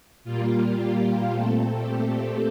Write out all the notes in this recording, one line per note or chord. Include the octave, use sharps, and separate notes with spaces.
A#2 G3 A#3 F4
G4
A#2 A3 C4 A4
G4